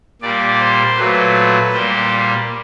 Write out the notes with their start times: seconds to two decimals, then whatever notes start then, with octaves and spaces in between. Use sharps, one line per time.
0.21 A#2 G3 A#3 D5
0.59 C5
0.97 A#2 F#3 A3 B4
1.73 A#2 G3 A#3 C5